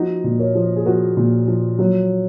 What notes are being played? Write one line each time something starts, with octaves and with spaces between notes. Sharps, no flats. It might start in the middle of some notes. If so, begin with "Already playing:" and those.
Already playing: F3 D#4 F#4
A#2
A#4 C#5
F3
G#4
F3 F#4 A#4
A#2
F3
F#3